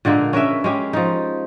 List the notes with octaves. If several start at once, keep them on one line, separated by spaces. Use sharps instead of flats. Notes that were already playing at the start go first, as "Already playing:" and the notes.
A#2 D3 G#3 A#3
C#4 A#4 B4 E5
G#3 C#4 G4
F3 D#4